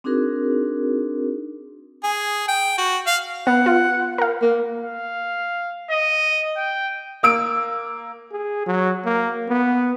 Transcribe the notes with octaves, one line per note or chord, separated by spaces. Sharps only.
C4 D4 D#4 F#4 G#4 A#4
G#4
G5
F#4
F5
B3 F#5
F4
A#4 F5
A#3
F5
D#5
G5
A#3 E6 D7
G#4
F#3
A#3
B3